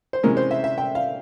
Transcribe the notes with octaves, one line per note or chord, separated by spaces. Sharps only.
C5
C3 E3 G#3 C#4 A#4
C5
E5
E5
G5
F5